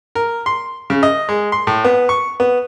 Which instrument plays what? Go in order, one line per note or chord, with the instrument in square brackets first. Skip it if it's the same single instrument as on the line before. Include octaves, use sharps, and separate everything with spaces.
[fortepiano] A#4
C6
C#3
D#5
G#3
C6
A2
B3
C#6
B3